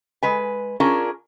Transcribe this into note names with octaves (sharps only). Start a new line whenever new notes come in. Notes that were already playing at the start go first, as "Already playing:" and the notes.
G#3 B4 G#5
C#4 D4 F4 G#4 A#4